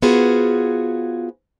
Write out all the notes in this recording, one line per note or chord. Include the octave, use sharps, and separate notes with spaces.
B3 F4 F#4 G#4 C5